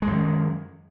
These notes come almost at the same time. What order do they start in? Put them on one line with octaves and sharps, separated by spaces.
G#3 F#2 D#3